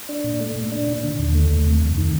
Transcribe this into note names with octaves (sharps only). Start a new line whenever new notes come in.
D4
A#2
A3
A#2
D4
A#2
D3
D#2
A3
D#2
C3
F2
D#3